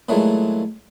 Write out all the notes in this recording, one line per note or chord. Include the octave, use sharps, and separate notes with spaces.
A#2 E3 F#3 G#3 A3